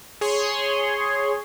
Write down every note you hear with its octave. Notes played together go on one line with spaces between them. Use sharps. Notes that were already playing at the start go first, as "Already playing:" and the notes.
G#4 C#5 C6